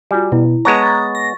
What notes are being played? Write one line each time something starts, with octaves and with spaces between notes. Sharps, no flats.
G3 F4 F#4 G#5
B2 E4
G#3 B3 C#5 A5 A#5 C#6
C#6 A6
A#6